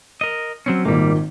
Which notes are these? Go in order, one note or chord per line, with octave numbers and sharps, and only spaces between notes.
A#4 D#5
F#3 C4 C#4
G#1 A#2 D#3 G3 A#3